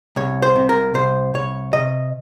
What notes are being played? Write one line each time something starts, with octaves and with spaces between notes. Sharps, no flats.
C2 C#5
C5
C3
A#4
C2 C5
C2 C#5
C3 D#5